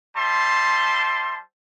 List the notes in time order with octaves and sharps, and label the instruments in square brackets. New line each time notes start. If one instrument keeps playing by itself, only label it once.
[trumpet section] G3 C5 E5 A5 C6